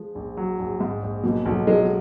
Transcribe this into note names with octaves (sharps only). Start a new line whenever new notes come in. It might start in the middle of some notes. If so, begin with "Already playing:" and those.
Already playing: F3 G#3
A#1
F#3
A#1
G#2
A#1
B2 F#3 A#3
B1 F#3
F#3 G#3
F3